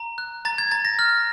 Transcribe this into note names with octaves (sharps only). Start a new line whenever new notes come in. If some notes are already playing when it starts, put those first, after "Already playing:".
Already playing: A#5
F#6
A#5 A6
G#6
A#5 A6
A#6
F6